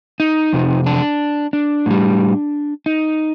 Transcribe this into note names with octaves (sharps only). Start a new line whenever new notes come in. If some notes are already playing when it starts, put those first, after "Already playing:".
D#4
F2 C3
D4
D4
A2 G3
D#4